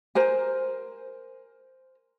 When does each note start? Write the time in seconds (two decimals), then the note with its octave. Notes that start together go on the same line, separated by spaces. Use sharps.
0.15 A#4 C5 G#5